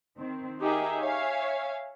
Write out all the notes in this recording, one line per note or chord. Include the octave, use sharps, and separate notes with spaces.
D#3 C4
D#4 G4 G#4 A#4 E5 G5
C#5 E5 F5 G#5